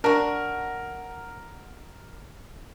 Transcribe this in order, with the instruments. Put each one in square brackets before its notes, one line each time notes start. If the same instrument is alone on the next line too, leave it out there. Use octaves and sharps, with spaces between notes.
[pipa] D4 F#4 [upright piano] A#4